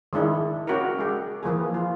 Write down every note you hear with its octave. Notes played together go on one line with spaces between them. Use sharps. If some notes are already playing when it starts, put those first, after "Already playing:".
D#3 G#3 D4 E4
C#4 F#4 G4 A#4
G#3 G4
E3 F3 A#3 G#4
F4